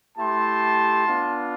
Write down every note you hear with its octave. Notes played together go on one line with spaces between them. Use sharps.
A3 E4 G4 A5 C6
B3 D4 F4